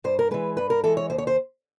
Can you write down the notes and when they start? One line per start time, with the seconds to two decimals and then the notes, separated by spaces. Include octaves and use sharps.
0.04 G2 C5
0.19 A#4
0.31 E3 G#3 B4
0.57 G2 B4
0.70 A#4
0.84 E3 G#3 A4
0.97 C#5
1.10 D#2 C5
1.18 C#5
1.27 C5